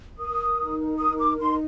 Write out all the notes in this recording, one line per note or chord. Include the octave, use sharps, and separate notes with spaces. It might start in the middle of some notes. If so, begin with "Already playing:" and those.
A#4 D#6
D#4
A#4 D#6
D6
D#4 C6